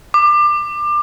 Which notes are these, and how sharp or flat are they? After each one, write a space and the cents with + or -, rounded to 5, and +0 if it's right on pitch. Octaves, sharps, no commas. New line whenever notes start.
D6 +25